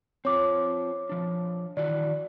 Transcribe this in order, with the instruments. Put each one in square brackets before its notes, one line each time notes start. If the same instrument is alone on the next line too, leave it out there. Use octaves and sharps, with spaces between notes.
[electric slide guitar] C4 F4 C5 [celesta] C#5 D6
[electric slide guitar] F3 D4
[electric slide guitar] D#3 E3 F#4 [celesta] D5